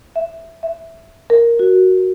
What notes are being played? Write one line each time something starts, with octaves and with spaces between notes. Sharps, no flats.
E5
E5
A#4
F#4